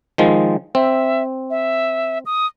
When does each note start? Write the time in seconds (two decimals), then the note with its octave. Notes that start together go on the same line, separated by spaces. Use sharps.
0.18 D#3 F3 G#3
0.75 C4 E5
1.50 E5
2.26 D#6